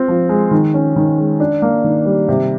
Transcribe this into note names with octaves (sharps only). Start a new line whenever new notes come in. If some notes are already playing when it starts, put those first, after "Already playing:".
Already playing: C4 F4
F3
G#3
D#3
C#4
D#3
G#3
D4
A#3
D#3
G3
C3